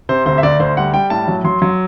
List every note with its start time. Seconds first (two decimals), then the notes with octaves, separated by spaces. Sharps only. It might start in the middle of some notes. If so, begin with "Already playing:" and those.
0.09 C3 C5
0.26 D2 C5
0.38 E5
0.43 D2 D5
0.60 D2 C5
0.77 G3 F#5
0.94 G3 G5
1.10 A2 A5
1.28 F#3
1.44 F#3 C6
1.62 F#3